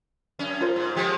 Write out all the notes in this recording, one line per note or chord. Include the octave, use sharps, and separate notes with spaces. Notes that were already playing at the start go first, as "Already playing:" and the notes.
F#2 C#4
F4 A#4 C5
G#2
F3 G#3 G4